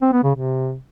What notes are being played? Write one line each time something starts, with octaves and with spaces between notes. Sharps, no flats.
C4
B3
C#3
C3